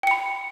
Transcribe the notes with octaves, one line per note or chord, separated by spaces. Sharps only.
G5 B5 C#7